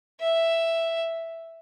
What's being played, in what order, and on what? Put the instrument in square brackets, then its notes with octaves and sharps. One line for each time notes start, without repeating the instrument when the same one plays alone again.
[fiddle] E5